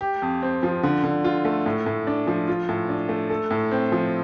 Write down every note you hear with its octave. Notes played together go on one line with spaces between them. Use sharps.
G4
F2
C4
F3
D3
D3
F4
A3
A2
A2
D4
F3
F4
A2
D4
A3
A4
A2
C4
F3